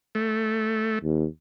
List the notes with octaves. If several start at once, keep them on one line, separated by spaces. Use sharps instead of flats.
A3
D#2